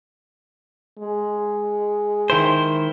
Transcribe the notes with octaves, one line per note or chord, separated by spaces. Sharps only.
G#3
D#3 E4 C5